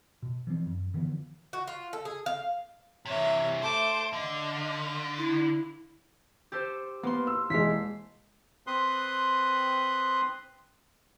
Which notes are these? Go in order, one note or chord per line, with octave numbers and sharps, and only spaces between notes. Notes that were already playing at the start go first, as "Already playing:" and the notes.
B2
E3 F3 C4
F#2
D3 E3 F3 B3
F#4
F4
A4
G#4
F5
C3 E3 C#5 E5
A3 C5 A5 D6
D3 D#5 F5
E4
G4 A4 C5
A#3 B3 C6
E6
E1 G#3 B6 C7
C4 B4 C6 D#6 F#6